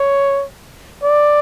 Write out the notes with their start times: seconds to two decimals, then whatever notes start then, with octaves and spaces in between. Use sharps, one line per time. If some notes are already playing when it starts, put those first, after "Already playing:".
Already playing: C#5
1.03 D5